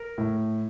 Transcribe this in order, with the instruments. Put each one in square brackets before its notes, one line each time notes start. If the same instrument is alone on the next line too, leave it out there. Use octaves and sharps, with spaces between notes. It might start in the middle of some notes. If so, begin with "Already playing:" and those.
Already playing: [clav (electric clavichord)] A#4
[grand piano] A2